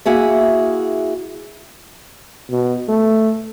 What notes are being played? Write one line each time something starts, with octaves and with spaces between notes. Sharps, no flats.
A#3 E4 F#4 G#4 E5
B2
A3